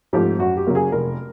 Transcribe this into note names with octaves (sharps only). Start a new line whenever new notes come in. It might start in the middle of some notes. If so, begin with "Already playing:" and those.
G#2 F3 A3 C4 G4
F#2 F#4
G4
C#3 F#3 A#3
G#4
F1 A#4